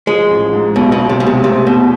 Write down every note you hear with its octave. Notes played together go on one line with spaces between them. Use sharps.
F3 G#3
A1
G#2
B1 B2
B2
B1
C3
B2 G#3
C3
C3 A3
E2 B2